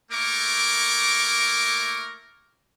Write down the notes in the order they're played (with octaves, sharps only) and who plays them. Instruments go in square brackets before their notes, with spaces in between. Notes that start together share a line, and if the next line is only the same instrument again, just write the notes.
[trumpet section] A3 A#3 E4 A#4 C#6 D6